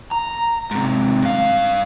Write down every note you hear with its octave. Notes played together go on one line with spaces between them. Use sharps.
A#5
G#2 C3
G2 F5